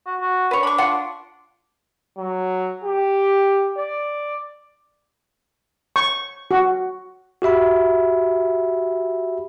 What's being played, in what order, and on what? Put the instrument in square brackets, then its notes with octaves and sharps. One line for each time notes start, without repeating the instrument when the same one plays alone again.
[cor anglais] F#4
F#4
[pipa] B4 C#5
[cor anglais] D4 [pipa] B5 C#6
[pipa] F4 F#5 C6
[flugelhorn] F#3
G4
D5
[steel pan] C#6
F#4
[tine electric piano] F#4 G4 E5 B5